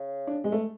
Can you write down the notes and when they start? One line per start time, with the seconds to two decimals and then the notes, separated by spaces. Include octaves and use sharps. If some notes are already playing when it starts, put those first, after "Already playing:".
Already playing: C#3
0.27 D4
0.44 G#3
0.52 A3